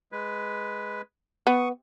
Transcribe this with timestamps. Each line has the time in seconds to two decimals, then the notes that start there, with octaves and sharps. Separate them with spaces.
0.12 G#3 B4
1.47 B3 C#6 D#6